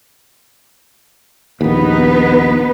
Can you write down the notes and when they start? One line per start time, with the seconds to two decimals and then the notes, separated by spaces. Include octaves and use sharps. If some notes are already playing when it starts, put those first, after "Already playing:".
1.61 A#1 D#2 B3 D#4 B4